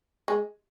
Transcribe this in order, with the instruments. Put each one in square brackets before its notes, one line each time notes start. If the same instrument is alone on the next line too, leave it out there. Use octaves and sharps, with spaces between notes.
[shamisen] G#3